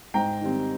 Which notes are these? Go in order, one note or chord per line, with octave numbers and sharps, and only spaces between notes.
G#2 G5 A#5
D#3 G3 C4